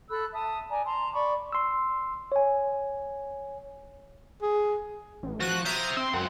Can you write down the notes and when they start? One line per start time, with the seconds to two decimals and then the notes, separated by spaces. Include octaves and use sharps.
0.10 A4 B5 E6 F#6
0.34 E5 A5 D#6
0.70 D5 G#5 A#5
0.85 A5 A#5 C6
1.13 D5 B5 C#6 D6
1.52 C6 E6
2.32 C#5 G#5
4.42 G#4
5.23 A1
5.40 F3 F#4 F#6
5.65 C5 E5 A#5 D#6 F6
5.97 C4 C6
6.14 C#2 F#2 F#5